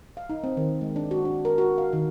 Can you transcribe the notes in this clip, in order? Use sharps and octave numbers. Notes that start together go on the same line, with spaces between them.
F5
D#4
C4
D#3
G#3
D4
F#4
D4
A#4
F#4
F5
D#3